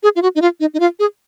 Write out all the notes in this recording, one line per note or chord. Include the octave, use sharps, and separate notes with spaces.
G#4
F4
F#4
D#4
F4
D#4
D#4
F4
G#4